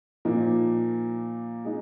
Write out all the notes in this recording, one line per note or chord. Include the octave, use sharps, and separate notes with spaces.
A#2 F3 A#3 D#4
G#3 D#4